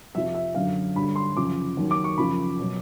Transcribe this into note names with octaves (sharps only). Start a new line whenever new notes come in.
F2 C3 F3 E5
E5
F#2 D3 F#3 F5
G2 D3 F#3 B5
C6
F#2 C#3 F3 D6
D#2 D#3 F#3
D6
C#6
F#2 C#3 F3 B5
B2 F#3